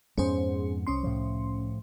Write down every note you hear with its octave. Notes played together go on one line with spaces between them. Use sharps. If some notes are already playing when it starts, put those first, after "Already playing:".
F2 G#2 B3 C#4 G#4 C5
C2 C#4 C6
A2 F3